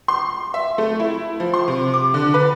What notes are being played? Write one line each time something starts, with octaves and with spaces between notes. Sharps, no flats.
C6
E5
A3
E4
F3
C6
C3
D6
D3
B4